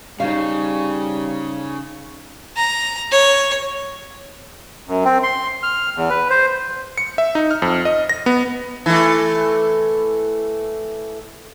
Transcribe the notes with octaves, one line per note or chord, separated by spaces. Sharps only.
C#3 G3 D#4 C5 F5
A#5
C#5
F#2
C4
C6
F6
E2
B4
C5
C#7
E5
D#4
F6
F2
D#5
A#6
B3
E3 A3